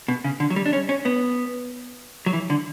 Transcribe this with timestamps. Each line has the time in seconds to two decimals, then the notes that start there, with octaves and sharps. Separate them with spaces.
0.08 B2
0.24 C#3
0.40 D3
0.50 F#3
0.56 G3
0.66 D4
0.73 C#4
0.89 C#4
1.05 B3
2.26 F#3
2.33 E3
2.50 D3